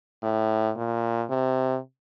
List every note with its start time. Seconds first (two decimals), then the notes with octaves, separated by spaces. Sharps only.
0.23 A2
0.76 A#2
1.30 C3